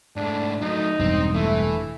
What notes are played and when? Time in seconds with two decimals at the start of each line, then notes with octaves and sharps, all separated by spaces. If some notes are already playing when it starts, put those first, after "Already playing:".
0.16 G#2 A3 D4
0.62 F#3 A3 D#4
1.00 E1 G2 C4
1.34 E3 A3